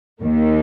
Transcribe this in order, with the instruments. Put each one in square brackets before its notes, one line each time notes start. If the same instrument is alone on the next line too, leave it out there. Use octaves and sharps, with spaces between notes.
[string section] D#2 D#3 A#3